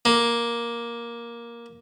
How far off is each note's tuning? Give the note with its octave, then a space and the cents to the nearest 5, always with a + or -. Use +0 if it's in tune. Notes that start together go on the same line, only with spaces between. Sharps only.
A#3 +10